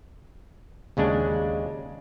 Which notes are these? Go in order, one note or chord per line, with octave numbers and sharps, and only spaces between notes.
D#2 C#3 G#3 D4